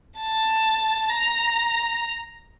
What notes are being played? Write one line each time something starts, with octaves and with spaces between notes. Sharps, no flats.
A5
A#5